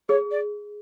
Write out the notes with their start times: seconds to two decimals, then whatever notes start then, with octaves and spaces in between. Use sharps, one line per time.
0.09 G#4 C#5
0.31 D5